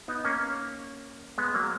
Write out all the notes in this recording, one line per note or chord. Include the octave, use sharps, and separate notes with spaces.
B3 D#4
A#3 C#4
G#3 B3
F#3 A#3